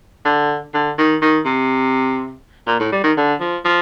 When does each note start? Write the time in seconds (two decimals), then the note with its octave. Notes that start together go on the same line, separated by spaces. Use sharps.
0.25 D3
0.74 D3
0.98 D#3
1.22 D#3
1.46 C3
2.67 A#2
2.80 A2
2.92 G3
3.04 D#3
3.17 D3
3.40 F3
3.65 F3